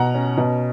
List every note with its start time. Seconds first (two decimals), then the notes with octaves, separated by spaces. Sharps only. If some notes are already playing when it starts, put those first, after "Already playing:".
Already playing: B2 F#5 A#5
0.14 C#4
0.37 B2